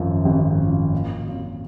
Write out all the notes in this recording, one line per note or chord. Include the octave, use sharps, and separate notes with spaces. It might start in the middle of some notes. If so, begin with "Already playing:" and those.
Already playing: G#1 F#2 F3
G#1
F#2 F3
A#2
F#3 C4 F4